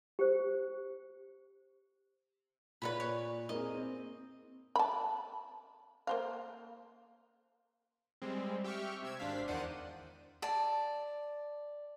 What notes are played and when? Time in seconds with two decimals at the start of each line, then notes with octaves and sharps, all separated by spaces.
0.19 G4 C5
2.82 A#2 B4 C#5 D5 B5
3.00 C#5
3.49 A#3 C4 G#4 D#5
3.74 C4
4.76 A5 B5
6.07 A#3 C5 F5
8.22 G3 G#3 C4
8.64 G4 E5 G5 C#6 F6
9.02 C3 E6 G#6
9.19 G#1 D4 C5 F5 B6
9.48 E2 D#3 C5 D5 F#5 D#7
10.42 D5 A5